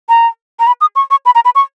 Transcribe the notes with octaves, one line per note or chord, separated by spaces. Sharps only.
A#5
A#5
B5
D#6
C#6
C#6
B5
A#5
B5
C#6